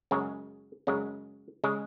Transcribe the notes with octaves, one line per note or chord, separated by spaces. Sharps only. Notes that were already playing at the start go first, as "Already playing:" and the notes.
F#2 C#3 G#3 C#4
F#2 C#3 G#3 C#4
C#3 G#3